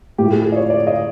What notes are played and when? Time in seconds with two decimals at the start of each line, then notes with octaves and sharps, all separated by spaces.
0.18 A2 F3 G4
0.32 G#4
0.44 G#4
0.52 D5
0.56 C#5
0.70 D5
0.87 D#5